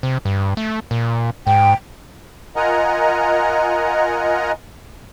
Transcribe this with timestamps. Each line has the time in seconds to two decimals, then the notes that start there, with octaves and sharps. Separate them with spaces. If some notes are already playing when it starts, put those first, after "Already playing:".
0.03 C3
0.25 G2
0.57 A3
0.91 A#2
1.47 G#2 G5
2.56 F4 A#4 D#5 F#5 G#5 A#5